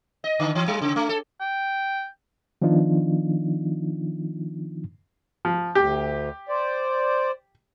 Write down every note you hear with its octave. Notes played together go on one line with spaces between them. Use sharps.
D#5
D3
E3
G3
C#3
A3
A4
G5
D#3 F3 B3 D4 D#4 F4
F3
D2 G4
C5 D5